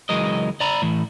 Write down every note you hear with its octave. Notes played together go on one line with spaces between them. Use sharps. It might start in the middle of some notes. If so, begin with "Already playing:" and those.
C#2 E3 F#3 G#3 A#4 D#5
D5 A#5 B5
A2 E3